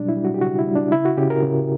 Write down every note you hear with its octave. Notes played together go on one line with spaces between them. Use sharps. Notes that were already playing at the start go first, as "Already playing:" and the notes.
Already playing: B2 F#3 G3 D4
E4
G3
F#4
G4
C#3 F#4
E4
G3
D4
C#3 E4
F#4
C#3 G4
A#4
C#3